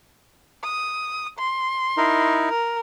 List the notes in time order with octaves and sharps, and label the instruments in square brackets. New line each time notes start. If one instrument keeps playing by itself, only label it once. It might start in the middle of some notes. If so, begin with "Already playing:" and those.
[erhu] D#6
C6
[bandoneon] D#4 E4 A#4
[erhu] A#4